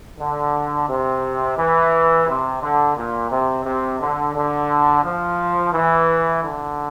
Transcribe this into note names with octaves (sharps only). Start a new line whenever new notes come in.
D3
C3
E3
C3
D3
A#2
C3
C3
D3
D3
F3
E3
D3